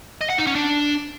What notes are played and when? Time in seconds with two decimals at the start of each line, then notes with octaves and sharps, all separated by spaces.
0.21 D#5
0.30 F#5
0.38 D#4
0.47 C#4
0.55 D4